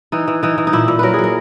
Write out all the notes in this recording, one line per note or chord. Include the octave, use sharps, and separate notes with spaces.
E3 D#4
E3
E3 D#4
E3
D#4
A#2 E4
A#2
F#3 A#4 B4
G#4
F#3 A#4